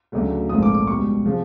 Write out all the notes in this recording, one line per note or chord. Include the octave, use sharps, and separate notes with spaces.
D2 C#3 F#3 A3
A#1 G#2 F3 A3 C4 D#6
D6
D6
C#2 B2 G3 C#6
C3 F3 G#3